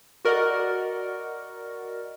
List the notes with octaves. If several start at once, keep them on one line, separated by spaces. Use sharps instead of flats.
F#4 A#4 D5 D#5 F#5